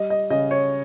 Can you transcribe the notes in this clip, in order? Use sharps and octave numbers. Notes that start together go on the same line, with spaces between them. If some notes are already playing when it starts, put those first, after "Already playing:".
Already playing: G3 D#5
D#5
C#3 D#5
C#5